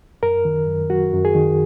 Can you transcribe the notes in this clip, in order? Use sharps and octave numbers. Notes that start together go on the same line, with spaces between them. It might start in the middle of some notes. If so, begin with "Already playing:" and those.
F#2 A#4
D#3
F#2
F#3 F#4
F#2
G#4
D#3